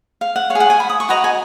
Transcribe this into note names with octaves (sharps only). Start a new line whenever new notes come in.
F5
F#5
C#5 F5
G#4
F#5
G#5
B5
D#6
C#6
F#4 B4 D#5 A#5
G#5